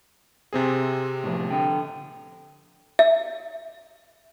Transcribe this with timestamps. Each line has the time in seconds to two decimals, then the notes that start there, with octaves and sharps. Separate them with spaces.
0.53 C3 C4 G#4
1.24 A2 F3
1.51 D3 G5
2.99 E5